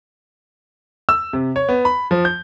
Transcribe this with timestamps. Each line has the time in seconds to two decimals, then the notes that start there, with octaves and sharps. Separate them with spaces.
1.09 E6
1.33 C3
1.56 C#5
1.69 B3
1.85 B5
2.11 F3
2.25 G6